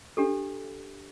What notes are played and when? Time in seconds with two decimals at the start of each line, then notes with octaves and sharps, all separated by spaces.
0.17 D4 G4 A4